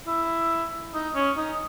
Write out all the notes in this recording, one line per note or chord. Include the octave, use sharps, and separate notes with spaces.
E4
D#4
C#4
D#4